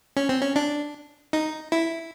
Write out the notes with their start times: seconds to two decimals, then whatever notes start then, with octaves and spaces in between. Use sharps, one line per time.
0.17 C#4
0.29 C4
0.42 C#4
0.56 D4
1.33 D#4
1.72 E4